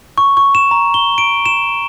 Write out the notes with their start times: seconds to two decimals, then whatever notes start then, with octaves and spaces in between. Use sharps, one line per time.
0.18 C#6
0.37 C#6
0.55 E7
0.71 A#5
0.94 G7
1.18 D7
1.46 E7